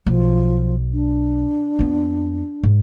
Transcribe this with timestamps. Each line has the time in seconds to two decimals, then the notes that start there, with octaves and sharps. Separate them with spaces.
0.06 B1 F3
0.93 D4
1.79 F2 B3
2.63 G#2